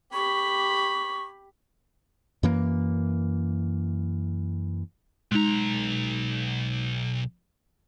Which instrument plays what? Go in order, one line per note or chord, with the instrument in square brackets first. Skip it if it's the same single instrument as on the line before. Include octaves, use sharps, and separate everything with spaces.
[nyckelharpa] G4 B5 [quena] C#6
[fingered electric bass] F#2 E3 A#3
[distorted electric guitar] B1 A#5 [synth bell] G#3 D#4